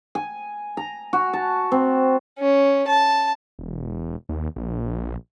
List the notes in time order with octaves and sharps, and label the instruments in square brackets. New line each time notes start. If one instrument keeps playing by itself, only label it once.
[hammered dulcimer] G#5
A#5
F#4
A5
C4
[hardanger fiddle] C#4
A5
[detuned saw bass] E1
D#2
A#1